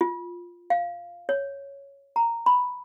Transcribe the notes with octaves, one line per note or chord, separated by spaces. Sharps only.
F4
F5
C#5
A#5
B5